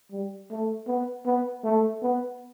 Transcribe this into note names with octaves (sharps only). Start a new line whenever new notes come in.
G3
A3
B3
B3
A3
B3